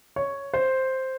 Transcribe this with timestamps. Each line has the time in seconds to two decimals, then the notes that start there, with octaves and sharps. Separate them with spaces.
0.16 C#5
0.54 C5